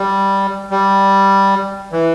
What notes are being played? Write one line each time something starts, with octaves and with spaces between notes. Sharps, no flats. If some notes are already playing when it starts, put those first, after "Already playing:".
Already playing: G3
G3
E3